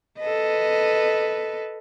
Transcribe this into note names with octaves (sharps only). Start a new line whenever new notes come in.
A4 B4 D#5